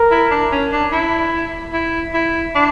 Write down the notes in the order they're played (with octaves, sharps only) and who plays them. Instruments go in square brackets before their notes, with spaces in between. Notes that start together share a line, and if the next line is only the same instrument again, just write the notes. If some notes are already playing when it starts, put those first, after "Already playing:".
Already playing: [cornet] A#4
[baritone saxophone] E4
D4
C#4
D4
E4
E4
E4
D4